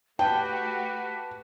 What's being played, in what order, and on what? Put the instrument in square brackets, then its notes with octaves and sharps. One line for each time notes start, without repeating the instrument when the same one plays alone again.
[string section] A3 F#4 G4 [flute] B4 [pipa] G5 [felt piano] A5